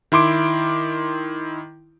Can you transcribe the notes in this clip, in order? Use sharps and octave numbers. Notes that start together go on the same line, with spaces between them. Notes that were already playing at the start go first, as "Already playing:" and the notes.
D#3 E4 C6 D6 D7